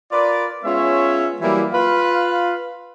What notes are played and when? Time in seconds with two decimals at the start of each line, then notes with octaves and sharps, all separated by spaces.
0.11 F4 A#4 B4 D5
0.64 G#3 B3 C#4 F4 C#5 E5
1.41 E3 F#3 G3 A#3 E4
1.73 F4 B4 F5